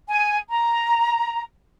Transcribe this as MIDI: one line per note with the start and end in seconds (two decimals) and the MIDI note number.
0.08 0.38 80
0.50 1.42 82